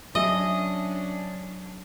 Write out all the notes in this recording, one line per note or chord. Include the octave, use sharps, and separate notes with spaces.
F#3 C#4 D4 G#4 D#5 E5